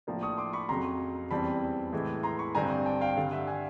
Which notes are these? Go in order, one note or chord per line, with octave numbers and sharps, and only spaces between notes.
A2 F3 A#3 D4
C#6 D#6
C6 D6
B5 C#6
F2 C#3 F#3 A#5 C6
E2 C#3 E3 G3 C4 A5 B5
A2 E3 G#3
A#5 C6
B5 C#6
G2 D3 G3 C4 G#5 A#5
G5 A5
F5 G5
G2 D3 G3 F5
E5 F#5
F#5 G#5